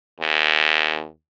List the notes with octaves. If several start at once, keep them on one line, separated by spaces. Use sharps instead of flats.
D#2